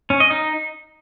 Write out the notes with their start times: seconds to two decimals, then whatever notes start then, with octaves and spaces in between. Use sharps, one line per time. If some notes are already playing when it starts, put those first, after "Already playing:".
0.10 C#4
0.20 D#5
0.31 D#4